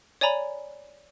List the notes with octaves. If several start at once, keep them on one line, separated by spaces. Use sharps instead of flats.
C#5 D5 G#5 A#5 B5